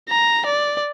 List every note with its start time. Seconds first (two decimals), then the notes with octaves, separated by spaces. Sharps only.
0.09 A#5
0.46 D5